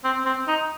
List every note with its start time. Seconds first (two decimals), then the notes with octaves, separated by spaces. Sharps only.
0.04 C4
0.26 C4
0.48 D#4